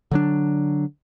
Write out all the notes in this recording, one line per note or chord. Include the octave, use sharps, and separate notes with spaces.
D3 F#3 D4